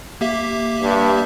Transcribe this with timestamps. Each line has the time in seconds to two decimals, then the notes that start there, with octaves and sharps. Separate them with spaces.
0.21 A#3 G4 E5
0.82 G2